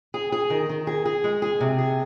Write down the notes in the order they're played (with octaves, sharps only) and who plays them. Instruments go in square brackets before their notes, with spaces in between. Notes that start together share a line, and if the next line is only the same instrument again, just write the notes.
[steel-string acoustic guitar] G#4
G#4
D#3
D#3
G#4
G#4
G#3
G#4
C3
G#4